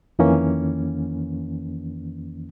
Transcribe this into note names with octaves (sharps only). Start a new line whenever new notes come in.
F2 D#3 E3 A#3 C#4